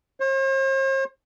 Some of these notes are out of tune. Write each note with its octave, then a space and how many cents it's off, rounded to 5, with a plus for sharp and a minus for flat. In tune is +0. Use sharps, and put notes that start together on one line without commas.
C5 +45